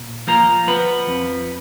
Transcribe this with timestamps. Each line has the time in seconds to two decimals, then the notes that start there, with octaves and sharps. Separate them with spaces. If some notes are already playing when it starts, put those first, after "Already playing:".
Already playing: A#2
0.27 F3 A#3 A#4
0.67 F3 B3 B4
1.07 F2